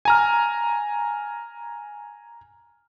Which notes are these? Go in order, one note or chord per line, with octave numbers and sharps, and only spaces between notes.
G#5 A#5 F6